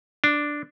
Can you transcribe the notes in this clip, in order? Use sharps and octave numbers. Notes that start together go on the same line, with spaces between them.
D4